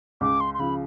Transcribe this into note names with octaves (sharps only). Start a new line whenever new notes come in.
C#2 D6
C6
C6
C#3 F3 B5